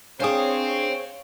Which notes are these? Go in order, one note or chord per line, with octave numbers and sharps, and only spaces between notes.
D4 G#4 C5 C#5 F5 G5 G#5 D#6